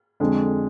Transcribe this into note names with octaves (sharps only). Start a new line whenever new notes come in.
F2 D3 G#3